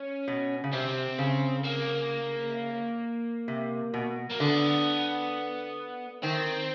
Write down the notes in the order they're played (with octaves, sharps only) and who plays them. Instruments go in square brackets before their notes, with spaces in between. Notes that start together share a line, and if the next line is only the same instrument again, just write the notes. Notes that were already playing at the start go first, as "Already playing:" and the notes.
Already playing: [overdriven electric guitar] C#4
[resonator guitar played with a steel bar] B2
C#3
[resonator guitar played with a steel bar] C3 [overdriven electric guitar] C4
[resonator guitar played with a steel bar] C#3
[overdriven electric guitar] A#3
[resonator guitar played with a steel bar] C3
B2
[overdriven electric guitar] A#3
[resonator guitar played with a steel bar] D3 [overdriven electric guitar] B3
[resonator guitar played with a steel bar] D#3 [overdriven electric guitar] C4